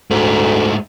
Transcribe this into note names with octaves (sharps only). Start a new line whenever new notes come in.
D2 G#2 A3